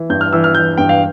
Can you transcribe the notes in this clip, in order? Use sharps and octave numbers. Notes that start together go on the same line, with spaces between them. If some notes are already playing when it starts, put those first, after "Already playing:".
Already playing: E3
G2 G6
F6
E3 E6
F6
E3 G6
G2 G5
F5